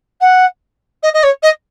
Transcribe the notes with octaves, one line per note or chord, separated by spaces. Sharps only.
F#5
D#5
D#5
C#5
D#5